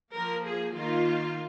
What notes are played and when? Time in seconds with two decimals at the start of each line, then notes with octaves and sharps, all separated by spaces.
0.14 F3 A#3 A#4
0.45 G#4
0.76 D#3 A#3 F4